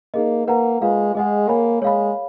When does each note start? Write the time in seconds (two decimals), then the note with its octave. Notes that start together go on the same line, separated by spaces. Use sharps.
0.14 A#3 D#4 G#4 D#5
0.47 A#3 B4 F#5 A#5
0.81 G#3 F4 B4 F5
1.15 G#3 G#4 D#5 F#5
1.48 A#3 C#5 G#5 B5
1.82 G#3 C#5 F5 B5